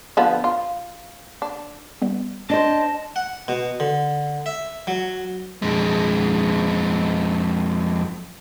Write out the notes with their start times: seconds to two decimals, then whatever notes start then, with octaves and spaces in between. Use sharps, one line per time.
0.17 D3 F3 B3
0.44 F4
1.42 D4
2.02 G3 B3
2.50 D4 C5 D#5 A5
3.16 F#5
3.48 B2
3.80 D3
4.46 E5
4.87 F#3
5.62 F2 G#3